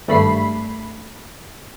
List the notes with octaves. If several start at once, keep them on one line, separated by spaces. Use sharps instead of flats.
G#1 G2 A3 B5 B6 C7